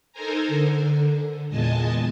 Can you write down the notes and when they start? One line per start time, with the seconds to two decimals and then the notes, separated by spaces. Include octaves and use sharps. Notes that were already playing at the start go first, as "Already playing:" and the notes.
0.12 D#4 A4 A#4 C5 G#5 A#5
0.47 D3
1.49 E2 A#2 G#3 D#5 G#5 A5